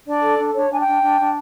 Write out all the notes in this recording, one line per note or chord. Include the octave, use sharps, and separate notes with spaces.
D4 D5
A4
D4
D4 C#5
D4 G#5
G5
D4
D4
D4